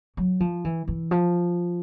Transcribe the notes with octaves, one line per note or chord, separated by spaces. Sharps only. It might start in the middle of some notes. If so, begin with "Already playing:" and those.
F#3
F3
E3
E3
F3